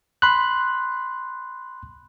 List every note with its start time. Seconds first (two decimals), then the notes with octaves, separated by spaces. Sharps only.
0.22 B5 C6 F#6